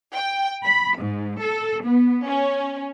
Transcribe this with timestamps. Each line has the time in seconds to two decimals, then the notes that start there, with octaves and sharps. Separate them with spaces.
0.15 G5
0.62 B5
0.97 G#2
1.40 A4
1.84 B3
2.26 C#4